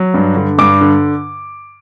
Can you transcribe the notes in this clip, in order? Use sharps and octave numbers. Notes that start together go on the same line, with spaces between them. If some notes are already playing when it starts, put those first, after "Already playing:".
Already playing: F#3
G2
D3
G2 D6
D3